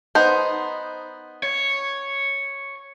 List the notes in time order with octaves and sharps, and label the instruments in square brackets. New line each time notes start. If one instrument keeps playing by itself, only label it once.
[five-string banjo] B3 D#4 C5
[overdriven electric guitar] C#5